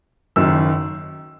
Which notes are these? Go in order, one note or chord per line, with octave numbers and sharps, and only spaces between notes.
F#1 F#2 D#3 E6